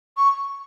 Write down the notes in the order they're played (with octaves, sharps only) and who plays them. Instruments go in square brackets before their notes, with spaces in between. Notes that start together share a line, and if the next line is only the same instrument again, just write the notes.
[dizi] C#6